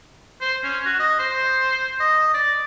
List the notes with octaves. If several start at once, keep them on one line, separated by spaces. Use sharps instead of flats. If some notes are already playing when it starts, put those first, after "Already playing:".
C5
C#4
F#4
D#5
C5
D#5
D5